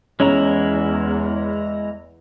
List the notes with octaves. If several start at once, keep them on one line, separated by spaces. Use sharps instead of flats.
E2 G#3 C#4 E4 A#5